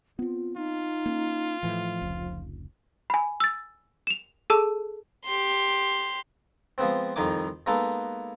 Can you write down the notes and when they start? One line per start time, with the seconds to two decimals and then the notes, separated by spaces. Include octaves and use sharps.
0.19 B3 C4 F4
0.57 D#4 F4
1.06 A#3 C#4
1.63 A2 E3 F3
2.01 F1 C#2
3.10 G#5 B5
3.40 E6 A6
4.07 E7 F7
4.50 G#4 A4 A5 E6
5.25 G4 C6
6.78 F3 G#3 B3 C4
7.16 C2 F2 D#3 D#4 G#5 D6
7.66 G#3 A#3 B3 D#4 A4